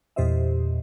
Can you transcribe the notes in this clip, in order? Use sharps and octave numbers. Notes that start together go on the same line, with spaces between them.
E2 A#2 G4 C5 D#5 E5